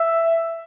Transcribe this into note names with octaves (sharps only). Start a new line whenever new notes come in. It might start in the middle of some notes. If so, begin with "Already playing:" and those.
Already playing: E5